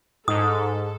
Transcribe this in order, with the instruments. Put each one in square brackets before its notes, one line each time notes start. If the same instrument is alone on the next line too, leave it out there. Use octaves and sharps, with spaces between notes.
[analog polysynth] G#2 [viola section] A4 [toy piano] D#6